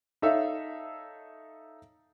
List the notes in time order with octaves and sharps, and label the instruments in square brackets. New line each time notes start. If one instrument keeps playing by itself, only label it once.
[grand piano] D#4 A4 C#5 E5 F5